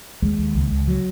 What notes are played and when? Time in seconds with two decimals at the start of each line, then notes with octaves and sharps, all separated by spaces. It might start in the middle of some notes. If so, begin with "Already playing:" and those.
0.22 D#2 G#3
0.38 D#2
0.55 C#2
0.71 C#2
0.88 F#3